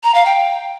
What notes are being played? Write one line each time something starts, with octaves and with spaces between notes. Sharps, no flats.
A#5
F5
G5